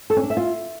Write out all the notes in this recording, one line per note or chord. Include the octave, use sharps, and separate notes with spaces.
A4
C#4
D4
E5
F4